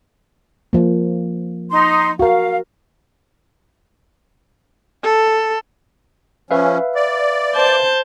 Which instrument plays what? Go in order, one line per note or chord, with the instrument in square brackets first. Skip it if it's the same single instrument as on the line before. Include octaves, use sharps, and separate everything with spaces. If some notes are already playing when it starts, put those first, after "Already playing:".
[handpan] F3 A#3
[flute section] D#4 C6
[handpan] F#4 A#4 [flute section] F5
[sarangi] A4
[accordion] F3 C#4 [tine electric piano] B4 E5 F5
[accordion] D5
[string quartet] C5 A5 G6